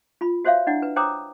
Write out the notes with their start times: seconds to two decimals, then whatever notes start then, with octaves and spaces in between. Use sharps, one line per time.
0.21 F4 B5
0.45 F#4 C5 C#5 E5 F5
0.67 D4 E4 D5 F#5
0.82 B4
0.96 C5 C#5 G5 A#5 D6 D#6